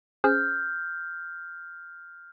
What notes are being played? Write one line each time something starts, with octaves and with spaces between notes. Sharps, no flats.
C#4 G#4 C5 F6 G6